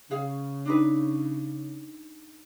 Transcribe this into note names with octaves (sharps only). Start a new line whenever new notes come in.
C#3 G#4 F5
D4 D#4 B4